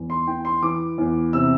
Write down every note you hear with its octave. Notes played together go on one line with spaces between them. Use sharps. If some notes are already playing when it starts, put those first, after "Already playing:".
Already playing: E2
C6
E3 G5
C6
E3 D6
E2
C3 E6